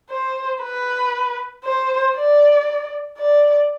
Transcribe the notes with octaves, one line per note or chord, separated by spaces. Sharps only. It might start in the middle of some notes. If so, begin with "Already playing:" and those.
C5
B4
C5
D5
D5